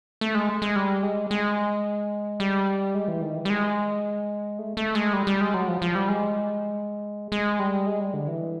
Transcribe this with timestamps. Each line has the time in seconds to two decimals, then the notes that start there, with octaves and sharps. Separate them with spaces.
0.21 A3
0.35 G#3
0.62 G#3
0.76 G3
1.03 G#3
1.31 G#3
2.40 G3
2.95 G#3
3.08 E3
3.22 D#3
3.36 E3
3.45 G3
3.50 G#3
4.59 A3
4.77 A3
4.95 G#3
5.13 G3
5.27 G3
5.41 G#3
5.54 F#3
5.68 F3
5.82 F3
5.95 G3
6.09 G#3
7.32 G#3
7.59 G3
7.87 G#3
8.00 G3
8.14 D3
8.28 E3